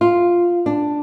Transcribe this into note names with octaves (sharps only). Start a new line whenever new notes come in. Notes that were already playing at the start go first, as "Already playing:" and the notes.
F4
D4